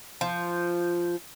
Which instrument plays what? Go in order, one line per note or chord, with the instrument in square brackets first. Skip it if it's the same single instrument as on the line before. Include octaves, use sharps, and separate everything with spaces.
[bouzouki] F3